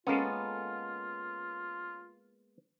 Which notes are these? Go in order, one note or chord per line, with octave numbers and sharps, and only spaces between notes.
G#3 A#3 B3 C#4 F4 A4